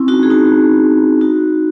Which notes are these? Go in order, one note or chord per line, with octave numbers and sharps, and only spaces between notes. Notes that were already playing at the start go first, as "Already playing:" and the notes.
Already playing: C4 C#4 E4
D#4 F#4
G#4
D#4 F#4
D#4 F#4